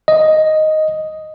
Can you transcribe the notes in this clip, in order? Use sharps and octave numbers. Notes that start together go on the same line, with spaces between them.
D#5